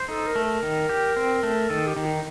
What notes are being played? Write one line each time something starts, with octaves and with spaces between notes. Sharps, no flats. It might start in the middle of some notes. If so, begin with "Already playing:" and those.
Already playing: C5
D#4 A4
A#4
A3
A#4
D#3
G4
C4
A3
D#3 A4
G4
D#3
D#4